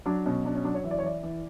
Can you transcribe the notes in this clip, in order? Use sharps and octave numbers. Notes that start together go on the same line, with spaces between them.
F#3 D4
B2 C#4
F#3 D4
C#4
F#3 D4
C#5
E3 E5
D5
C#5
E3 D5
E3